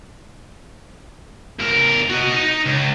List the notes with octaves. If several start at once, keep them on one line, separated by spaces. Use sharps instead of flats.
E2 A#4
F#4 D#5
D#4
C#2